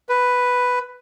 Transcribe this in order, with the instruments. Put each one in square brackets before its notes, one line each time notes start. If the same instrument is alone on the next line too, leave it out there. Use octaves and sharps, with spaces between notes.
[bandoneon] B4